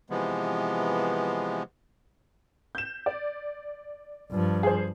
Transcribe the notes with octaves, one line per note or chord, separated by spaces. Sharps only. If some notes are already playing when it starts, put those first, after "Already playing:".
C3 E3 F3 G#3 B3
G6 E7
D5
G2 F3
G#4 C5